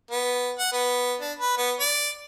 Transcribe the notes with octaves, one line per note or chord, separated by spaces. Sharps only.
B3
F#5
B3
D4
B4
B3
D5